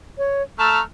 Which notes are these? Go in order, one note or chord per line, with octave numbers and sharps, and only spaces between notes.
C#5
A3 A5 A#5 C#6 E6 F6